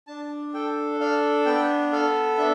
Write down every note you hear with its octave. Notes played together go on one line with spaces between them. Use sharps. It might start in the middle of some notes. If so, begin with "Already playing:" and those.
D4 A5
A4 G5
D4 F5
B3 G5
A4 F5
D4 E5